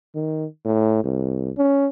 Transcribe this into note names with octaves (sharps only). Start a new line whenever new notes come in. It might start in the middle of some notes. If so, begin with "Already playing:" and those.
D#3
A2
C2
C#4